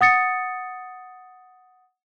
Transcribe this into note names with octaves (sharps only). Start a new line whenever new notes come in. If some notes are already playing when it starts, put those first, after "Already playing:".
F#5 D#6 A6 C#7